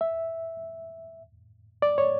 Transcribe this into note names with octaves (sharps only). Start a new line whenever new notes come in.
E5
D5
C#5